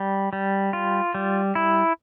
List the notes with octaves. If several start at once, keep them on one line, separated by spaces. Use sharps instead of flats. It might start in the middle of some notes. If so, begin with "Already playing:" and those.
Already playing: G3
G3
F4
G3
E4